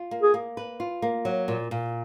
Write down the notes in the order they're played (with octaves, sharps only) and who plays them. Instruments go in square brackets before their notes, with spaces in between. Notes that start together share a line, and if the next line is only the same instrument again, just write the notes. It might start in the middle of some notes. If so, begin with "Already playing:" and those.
Already playing: [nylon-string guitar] F4
A#3
[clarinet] G#4
[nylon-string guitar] A#3
B4
F4
A#3
F#3
A#2
A#2